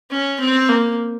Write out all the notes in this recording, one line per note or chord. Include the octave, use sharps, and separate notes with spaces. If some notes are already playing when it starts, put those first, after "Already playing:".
C#4
C4
A#3